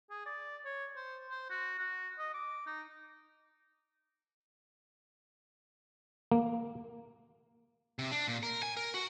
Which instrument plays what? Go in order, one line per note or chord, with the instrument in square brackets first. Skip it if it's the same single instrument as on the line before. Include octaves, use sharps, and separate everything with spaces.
[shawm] G#4
D5
C#5
C5
C5
F#4
F#4
D#5
D6
D#4
[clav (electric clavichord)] A#3
[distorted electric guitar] C3
D4
A#2
A#4
G#5
A#4
F#4